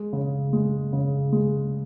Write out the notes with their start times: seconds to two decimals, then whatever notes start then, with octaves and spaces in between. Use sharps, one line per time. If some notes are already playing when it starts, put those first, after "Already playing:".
Already playing: G#3
0.13 C#3
0.53 G#3
0.93 C#3
1.33 G#3